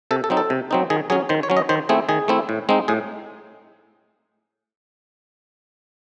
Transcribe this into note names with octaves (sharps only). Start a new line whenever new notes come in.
C3 A4
A4
F#3 C4 D#4
A4
C3
F#3 C4 D#4
D#3 G#4
F#3 C#4 G#4
D#3 C5
C#5
F#3 C#4
D#5
D#3 C5
A3 C4 E4 G#4
D#3 G#4
A3 C4 E4
A2
G#3 C4 D#4
A2 G#4